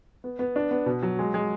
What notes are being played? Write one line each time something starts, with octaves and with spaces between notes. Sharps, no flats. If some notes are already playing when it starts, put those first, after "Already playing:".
B3
B3
D4
B3
B2
F#3
G#3
G#3